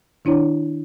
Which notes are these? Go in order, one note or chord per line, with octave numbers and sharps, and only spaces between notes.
D#3 D4 E4 C#5